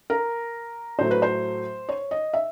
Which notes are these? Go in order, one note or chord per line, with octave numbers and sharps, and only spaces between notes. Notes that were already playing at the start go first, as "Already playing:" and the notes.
A#4
A2 F#3 A3 C5
B4
C5
C#5
D#5
E5